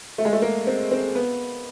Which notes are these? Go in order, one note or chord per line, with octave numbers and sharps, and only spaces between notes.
A3
G#3
A3
A#3
C4
C4
B3